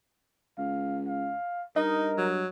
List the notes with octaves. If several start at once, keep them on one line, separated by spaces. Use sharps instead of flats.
C#2 F5
F5
G2 D#4 A#4 D#5
F#3